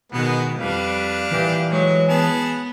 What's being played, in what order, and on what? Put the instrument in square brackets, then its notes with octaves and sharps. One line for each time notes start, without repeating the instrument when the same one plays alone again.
[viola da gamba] B2 D#3 [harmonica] G#3 B3
[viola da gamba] F2 G3 B4 [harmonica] D4 F5
[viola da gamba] A#2 G4 [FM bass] E3
[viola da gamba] F#3 G#3 C#5
[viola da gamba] B3 [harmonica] G#4 A5